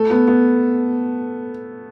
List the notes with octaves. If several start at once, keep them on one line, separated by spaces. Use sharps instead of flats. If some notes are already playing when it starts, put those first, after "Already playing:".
Already playing: A3 A4
B3
B3